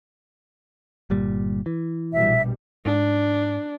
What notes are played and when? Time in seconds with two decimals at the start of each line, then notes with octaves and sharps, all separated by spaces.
1.10 G1 A#2 G3
1.66 E3
2.13 A#1 B2 G3 E5
2.86 G#2 D4